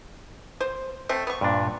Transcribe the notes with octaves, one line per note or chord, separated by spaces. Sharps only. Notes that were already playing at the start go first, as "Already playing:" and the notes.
C5
A3 C4
B3 C#6
G2 A#2 D4